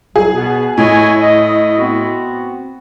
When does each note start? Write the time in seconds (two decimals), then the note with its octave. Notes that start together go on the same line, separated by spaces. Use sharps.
0.16 C2 A2 F#3 G#4
0.33 B2 B3
0.78 A2 C#5 D#5 G#5
1.21 D#5
1.78 B3 C4 F#4